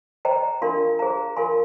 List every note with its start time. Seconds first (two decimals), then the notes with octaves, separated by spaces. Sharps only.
0.25 C5 D#5 G5 A#5
0.62 D4 F4 A#4 F5 C6
0.99 G#4 C5 F5 A#5
1.36 F4 A#4 F5 G#5 C6